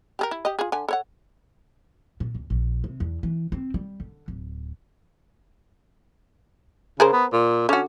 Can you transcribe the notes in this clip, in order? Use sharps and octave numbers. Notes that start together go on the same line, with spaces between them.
G4 G#4 A#4
E4
G4 D#5
F4 G#4
D3 G#5
A4 C#5 F#5
A#2
C#2
A#1
C3
E2
E3
C4
G3
D3
D1
C#3 G#4 A#4 C5
B3
A#2
D3 C#4 F#4